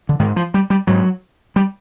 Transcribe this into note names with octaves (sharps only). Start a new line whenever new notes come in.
D3
G#2 D#3
F3
G3
G3
G#2 F#3
G3